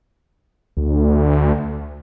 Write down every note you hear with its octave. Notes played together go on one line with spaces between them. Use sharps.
D2